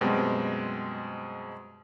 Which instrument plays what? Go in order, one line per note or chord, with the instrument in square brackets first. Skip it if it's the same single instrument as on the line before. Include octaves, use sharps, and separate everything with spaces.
[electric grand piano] F#2 B2 G3 G#3 C4